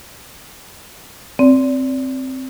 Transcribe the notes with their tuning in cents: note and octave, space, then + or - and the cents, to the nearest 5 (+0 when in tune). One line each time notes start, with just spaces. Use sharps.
C4 +0 D5 -30